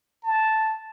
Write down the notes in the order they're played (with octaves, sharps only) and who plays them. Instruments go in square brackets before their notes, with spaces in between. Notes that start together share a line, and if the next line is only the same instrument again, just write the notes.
[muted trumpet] A5